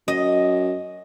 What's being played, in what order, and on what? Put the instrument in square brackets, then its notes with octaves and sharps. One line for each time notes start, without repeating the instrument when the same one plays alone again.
[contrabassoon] F#2 [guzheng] D#5